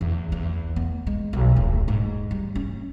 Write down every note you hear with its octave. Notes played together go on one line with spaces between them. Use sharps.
E2
E2
B3
G#3
B1
D#1
G#2
G3
C#4